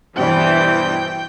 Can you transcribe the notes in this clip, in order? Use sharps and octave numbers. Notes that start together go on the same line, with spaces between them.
G2 B2 E3 C5 D5 G5